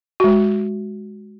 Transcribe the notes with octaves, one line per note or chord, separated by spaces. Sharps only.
G#3 F#4